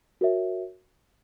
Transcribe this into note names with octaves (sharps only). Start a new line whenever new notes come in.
F#4 A#4 C#5 E5